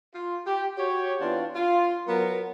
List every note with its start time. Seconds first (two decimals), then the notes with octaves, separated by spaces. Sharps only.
0.15 F4
0.46 G4
0.78 F#4 G4 C#5
1.21 E3 B3 C4 D4 F4
1.55 F4
2.07 F#3 B3 A#4